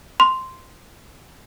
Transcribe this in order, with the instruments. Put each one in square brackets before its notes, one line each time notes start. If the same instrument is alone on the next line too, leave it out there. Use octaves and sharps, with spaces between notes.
[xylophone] C6